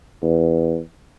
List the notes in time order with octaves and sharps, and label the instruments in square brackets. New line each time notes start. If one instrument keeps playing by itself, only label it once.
[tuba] E2